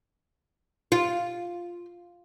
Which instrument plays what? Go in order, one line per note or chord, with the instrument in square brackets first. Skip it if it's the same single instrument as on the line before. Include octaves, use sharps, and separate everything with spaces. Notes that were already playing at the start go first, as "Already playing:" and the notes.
[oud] F4